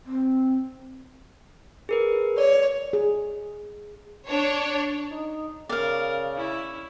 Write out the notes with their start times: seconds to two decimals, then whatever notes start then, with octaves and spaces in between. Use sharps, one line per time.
0.06 C4
1.89 G#4 A#4 B4
2.38 C#5 D5
2.93 G#4
4.27 D4 C#5
5.11 D#4
5.69 C#3 A#4 D5 F5
6.35 C#4 E4